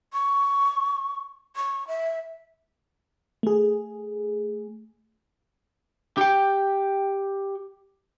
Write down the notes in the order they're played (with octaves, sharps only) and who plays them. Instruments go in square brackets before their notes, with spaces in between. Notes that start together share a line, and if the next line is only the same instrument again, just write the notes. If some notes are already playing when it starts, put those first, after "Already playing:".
[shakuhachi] C#6
C#6
E5
[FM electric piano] A3 G#4
[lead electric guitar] G4 G5